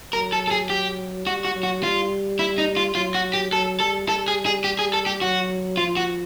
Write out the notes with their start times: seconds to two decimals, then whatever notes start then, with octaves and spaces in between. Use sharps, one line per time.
0.13 F#3 A#4
0.33 A4
0.47 A4
0.51 G#4
0.70 G4
1.26 G3 F#4
1.45 F#4
1.54 F#3
1.63 F#4
1.82 G3 F4
2.39 E4
2.58 D#4
2.77 F4
2.95 F#3 F4
3.15 F#4
3.34 G4
3.52 F#3 A4
3.80 G3 A4
4.09 G3 A4
4.28 G#4
4.46 G#4
4.64 G4
4.79 G#4
4.93 A4
5.07 G4
5.21 F#3 F#4
5.77 F3 F4
5.97 F#4